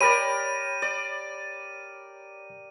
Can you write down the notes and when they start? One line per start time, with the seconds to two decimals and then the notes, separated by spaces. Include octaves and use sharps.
0.01 G4 A#4 C#5 D5 B5 D#7
0.82 D5